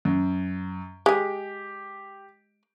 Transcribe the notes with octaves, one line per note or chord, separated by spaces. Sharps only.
F#2
G#3 G4 G#4